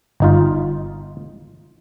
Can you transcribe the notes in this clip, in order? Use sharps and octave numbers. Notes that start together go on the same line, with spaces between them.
G1 D#4 F4